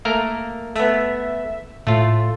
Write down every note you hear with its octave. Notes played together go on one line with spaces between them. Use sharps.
A3 A#3 A#4
A3 B3 E5
A2 A3 F4